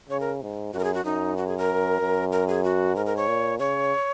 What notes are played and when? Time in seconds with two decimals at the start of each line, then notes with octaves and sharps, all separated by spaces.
0.09 C#3 C#5
0.20 A#4
0.42 G#2
0.73 F#2 F#4
0.79 A#4
0.84 G#4
0.94 F#4
1.05 F#2 D#4
1.37 F#4
1.47 G#4
1.58 A#4
2.00 F#2
2.32 A#4
2.48 G#4
2.64 F#4
2.96 G#2 A#4
3.06 A#4
3.17 C#5
3.27 A#2
3.59 C#3 C#5